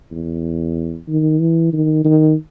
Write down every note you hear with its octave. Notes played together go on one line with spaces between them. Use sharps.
E2
D#3
E3
D#3
D#3